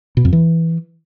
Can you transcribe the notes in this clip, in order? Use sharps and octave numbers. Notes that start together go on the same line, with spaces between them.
B2
F2
E3